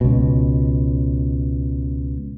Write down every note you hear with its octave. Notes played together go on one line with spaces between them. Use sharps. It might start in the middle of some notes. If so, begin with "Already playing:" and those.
C#2 B2